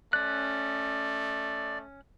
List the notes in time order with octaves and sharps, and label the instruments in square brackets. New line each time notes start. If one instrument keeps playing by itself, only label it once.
[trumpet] A3 [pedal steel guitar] C#4 F#6 [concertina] D5